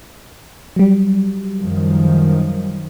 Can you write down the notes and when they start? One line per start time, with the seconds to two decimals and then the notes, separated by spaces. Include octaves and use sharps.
0.76 F#3 G3
1.59 F#2 D#3 F3